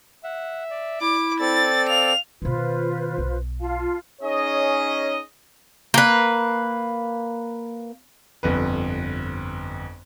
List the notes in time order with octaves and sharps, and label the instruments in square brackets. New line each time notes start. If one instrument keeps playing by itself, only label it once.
[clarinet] E5 [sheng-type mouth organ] F#5
[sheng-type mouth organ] D5
[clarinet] E4 [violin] D6
[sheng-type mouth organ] C4 A4 D5 [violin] A6
[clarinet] F5 [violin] F7
[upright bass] B2 D#3 [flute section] F4 B4 C5
[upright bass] B1
[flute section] F4 F5 A5
[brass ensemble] C#4 D#4 G#4 C#5 D#5
[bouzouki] A#3 B4
[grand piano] G1 F2 B4